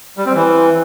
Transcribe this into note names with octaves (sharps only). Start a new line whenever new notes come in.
G3
C4
E3